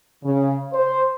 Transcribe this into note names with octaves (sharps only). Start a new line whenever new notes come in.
C#3
C5